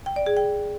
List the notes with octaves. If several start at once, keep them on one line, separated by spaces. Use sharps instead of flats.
G5
D5
G#4
G5